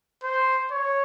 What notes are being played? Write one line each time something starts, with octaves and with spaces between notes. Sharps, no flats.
C5
C#5